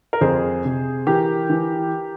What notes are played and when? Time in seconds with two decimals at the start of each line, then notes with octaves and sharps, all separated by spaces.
0.13 A#4
0.21 F2 G#4 C5
0.65 C3
1.07 E3 G4 A#4
1.50 E3